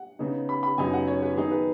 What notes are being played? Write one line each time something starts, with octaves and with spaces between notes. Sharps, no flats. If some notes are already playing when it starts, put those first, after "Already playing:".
Already playing: F#5
C#3 B3 D#4
B5
B5
F#2 C#3 F#3 B3 D#4 G#5
F#5
C#5
B4
D#3 F#3 B3 D#4 G#4
B4